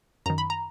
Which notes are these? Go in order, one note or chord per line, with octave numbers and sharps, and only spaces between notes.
F#2 D#3 A#5
B5
A#5